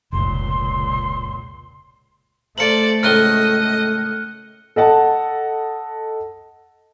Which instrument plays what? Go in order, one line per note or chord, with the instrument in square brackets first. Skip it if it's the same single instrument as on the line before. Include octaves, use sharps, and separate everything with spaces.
[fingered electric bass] F1 [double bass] C#2 A#2 [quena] C6
[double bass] A3 [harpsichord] A4 F5 A#5 [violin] C5 D5 [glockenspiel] C#7 F#7
[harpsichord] C#2 A2 D#3 [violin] D#5 [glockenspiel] F6 F#6 G7
[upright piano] A4 D#5 F#5 A5